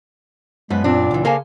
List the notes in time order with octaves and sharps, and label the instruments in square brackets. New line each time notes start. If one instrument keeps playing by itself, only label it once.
[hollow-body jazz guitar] F#2 [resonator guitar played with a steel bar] F3 B3 B4 [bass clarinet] G#3
[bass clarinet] A#2 [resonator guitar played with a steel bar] B3 C4 D4
[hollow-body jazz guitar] C#2 E3
[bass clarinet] C#3 [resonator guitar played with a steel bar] A#3 A4 G#5 [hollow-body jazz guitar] A#4 C5 F5